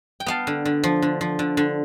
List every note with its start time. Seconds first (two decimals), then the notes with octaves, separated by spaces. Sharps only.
0.20 G5
0.26 B3 F5 A5
0.47 D3
0.65 D3
0.84 F3
1.02 D3
1.21 F3
1.39 D3
1.57 D3